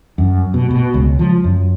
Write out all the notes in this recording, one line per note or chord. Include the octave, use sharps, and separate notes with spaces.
F#2
B2
B2
C#2
F3
F#2